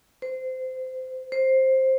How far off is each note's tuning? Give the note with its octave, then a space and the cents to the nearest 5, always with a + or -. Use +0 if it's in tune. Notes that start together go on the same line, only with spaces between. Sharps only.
C5 -20
C5 +10